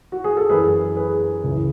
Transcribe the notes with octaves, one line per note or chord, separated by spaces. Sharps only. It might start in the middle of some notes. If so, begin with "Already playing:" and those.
F#4
G#4
A4
F#2 E3 G#4 B4
G#4 B4
C#2 C#3 E3